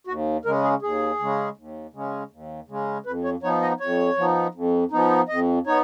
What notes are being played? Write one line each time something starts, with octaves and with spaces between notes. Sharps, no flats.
D#2 F#4
C#3 G#3 C#4 A#4
G#4
D#2 G#4
C#3 G#3 C#4
D#2
C#3 G#3 C#4
D#2
C#3 G#3 C#4
F2 B4
C#5
F3 B3 D#4 C#5
D#5
F2 C#5
F3 B3 D#4
F2
F3 B3 D#4
F2 D#5
B3 D#4 C#5